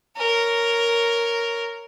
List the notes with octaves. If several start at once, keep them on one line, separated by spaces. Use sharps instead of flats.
A#4 C#5